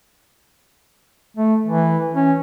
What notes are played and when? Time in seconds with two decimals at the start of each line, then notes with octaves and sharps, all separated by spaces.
1.37 A3
1.67 E3
2.14 C#4